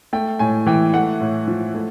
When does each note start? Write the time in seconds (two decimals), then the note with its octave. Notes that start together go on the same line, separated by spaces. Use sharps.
0.13 A3 G5
0.39 A2 G#5
0.66 E3 G5
0.94 A3 F#5
1.21 A2
1.48 F3
1.75 A3